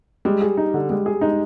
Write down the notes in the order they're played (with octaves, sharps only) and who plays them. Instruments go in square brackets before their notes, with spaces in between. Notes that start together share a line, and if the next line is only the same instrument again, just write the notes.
[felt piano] G3 [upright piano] G#3
[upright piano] G#4
D#4
D3
[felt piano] G3 [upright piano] G#3
[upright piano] G#4
[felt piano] G#3 [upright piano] D#4